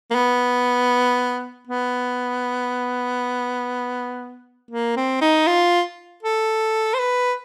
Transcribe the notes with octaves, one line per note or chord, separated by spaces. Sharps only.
A#3
B3
B3
A#3
C4
D#4
F4
A4
C5
B4